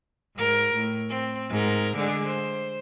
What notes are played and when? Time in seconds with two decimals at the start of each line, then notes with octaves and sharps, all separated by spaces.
0.36 G#2 A#4
0.74 A2
1.09 C4
1.49 G#2 A#4
1.96 D3 G#3 D4
2.26 C5